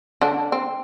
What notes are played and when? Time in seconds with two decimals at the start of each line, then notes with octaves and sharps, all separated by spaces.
0.21 D3 D4
0.52 C4